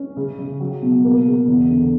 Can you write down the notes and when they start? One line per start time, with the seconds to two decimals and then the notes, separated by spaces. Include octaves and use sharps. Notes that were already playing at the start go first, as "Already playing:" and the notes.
Already playing: C#4
0.17 C#3
0.38 C#3
0.60 F#3
0.83 B2
1.05 A#3
1.26 C#3
1.47 E2
1.70 D3